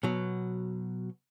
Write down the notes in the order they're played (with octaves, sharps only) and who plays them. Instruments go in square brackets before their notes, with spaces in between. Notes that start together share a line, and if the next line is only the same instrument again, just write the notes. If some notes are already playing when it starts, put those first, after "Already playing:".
[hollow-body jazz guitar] B2 F#3